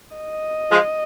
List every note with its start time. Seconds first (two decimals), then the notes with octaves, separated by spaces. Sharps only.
0.17 D#5
0.70 F3 G#3